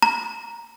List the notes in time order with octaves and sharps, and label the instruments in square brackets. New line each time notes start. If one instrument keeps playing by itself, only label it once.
[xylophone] A#5